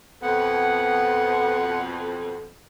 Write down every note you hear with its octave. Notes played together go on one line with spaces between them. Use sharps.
F2 B2 B3 F#5